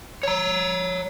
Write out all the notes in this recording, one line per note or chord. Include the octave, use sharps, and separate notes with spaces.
C#5 A#5